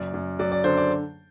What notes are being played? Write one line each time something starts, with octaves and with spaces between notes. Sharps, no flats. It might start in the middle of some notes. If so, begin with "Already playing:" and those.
Already playing: F#1 F#2 D5
F#2
F#3 D5
D5
D3 C5
D5